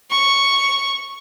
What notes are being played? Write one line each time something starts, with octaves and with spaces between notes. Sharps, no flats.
C#6